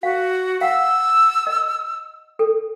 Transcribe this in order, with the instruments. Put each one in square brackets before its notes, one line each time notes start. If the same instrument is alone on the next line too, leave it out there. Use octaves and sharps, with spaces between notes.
[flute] F#4 [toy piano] F5
[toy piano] F5 F#5 [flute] E6
[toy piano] D#5
A4